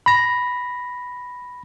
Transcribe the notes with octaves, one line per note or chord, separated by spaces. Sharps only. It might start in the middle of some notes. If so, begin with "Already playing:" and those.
B5 A#6